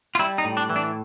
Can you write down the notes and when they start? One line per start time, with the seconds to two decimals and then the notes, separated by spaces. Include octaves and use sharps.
0.15 F4
0.19 G3 E4
0.38 D#4
0.44 A2
0.57 D4
0.70 E3
0.76 D4